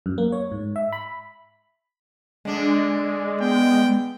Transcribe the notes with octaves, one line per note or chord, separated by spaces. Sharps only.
F#2
A#3
C#5
G#2
E5
B5
D3 G#3 D4
B3 G5